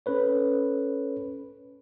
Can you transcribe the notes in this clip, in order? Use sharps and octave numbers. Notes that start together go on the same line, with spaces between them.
C#4 A4 B4 C#5